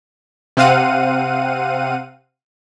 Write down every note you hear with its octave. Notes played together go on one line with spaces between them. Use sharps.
C3 C4 F5 F#5 D#7